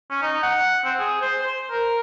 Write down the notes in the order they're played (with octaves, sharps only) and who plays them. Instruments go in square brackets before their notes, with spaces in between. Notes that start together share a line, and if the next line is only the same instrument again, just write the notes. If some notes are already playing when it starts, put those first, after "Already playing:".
[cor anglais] C#4
D#4
F#5
C4
G#4
C5
C5
A#4